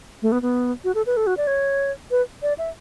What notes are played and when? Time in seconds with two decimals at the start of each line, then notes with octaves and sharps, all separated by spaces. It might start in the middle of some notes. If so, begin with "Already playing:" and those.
0.22 A3
0.32 B3
0.42 B3
0.84 F#4
0.95 A4
1.06 B4
1.17 A4
1.27 F#4
1.37 D5
1.47 C#5
2.11 B4
2.42 D5
2.58 E5